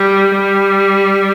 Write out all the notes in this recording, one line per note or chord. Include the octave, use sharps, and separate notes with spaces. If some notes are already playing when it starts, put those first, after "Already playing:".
Already playing: G3
G3